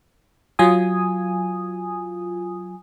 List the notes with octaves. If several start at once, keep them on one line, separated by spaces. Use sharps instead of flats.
F#3 F4 G#5 D#6